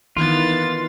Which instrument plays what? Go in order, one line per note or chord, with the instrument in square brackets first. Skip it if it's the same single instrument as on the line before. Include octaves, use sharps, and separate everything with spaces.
[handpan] D#3 E3 [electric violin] B3 A6 [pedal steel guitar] F4